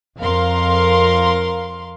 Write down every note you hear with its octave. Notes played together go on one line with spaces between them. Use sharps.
F2 A#4 F5 C6